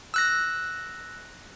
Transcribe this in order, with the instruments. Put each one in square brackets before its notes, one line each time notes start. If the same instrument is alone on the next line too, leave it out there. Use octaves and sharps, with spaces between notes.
[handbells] E6 F#6 A#6